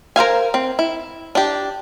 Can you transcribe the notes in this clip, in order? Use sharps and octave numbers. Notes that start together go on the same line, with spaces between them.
A#4 C5 F5 G#5
C4
E4
D4 G4